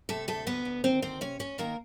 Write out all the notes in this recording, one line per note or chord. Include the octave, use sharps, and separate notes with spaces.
C3 A3 A4
D2 A3 A4
D2 B3 B4
D2
D#3 C4 C5
D2 C4 C5
C3 C#4 C#5
D2 C#4 C#5
D#3 A#3 A#4